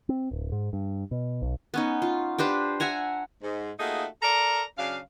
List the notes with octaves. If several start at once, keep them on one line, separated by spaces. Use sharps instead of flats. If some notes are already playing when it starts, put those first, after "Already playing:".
C4
D1
G#2
G2
B2
B1
B3 C#4 D#4
F4
D4 G4 B4 C5
E5 F#5 G#5 A#5
G#2
A3 A#3 D#4 F4 F#4 G#4
A4 A#4 D5 A#5
C#3 F#3 D4 F5